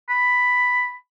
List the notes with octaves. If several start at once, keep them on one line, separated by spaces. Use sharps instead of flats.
B5